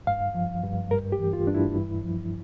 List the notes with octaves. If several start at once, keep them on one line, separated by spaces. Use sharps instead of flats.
G2 F5
F3
G2
G2 A#4
G4
E3
F4
G2 D4
E4
G2
F3